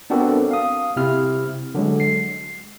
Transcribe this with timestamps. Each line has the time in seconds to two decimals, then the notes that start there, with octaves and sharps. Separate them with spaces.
0.10 B3 C4 D4 F#4 A4 A#4
0.51 F5 D#6
0.96 C3 E4 F6
1.75 D3 F#3 G#3
2.00 C7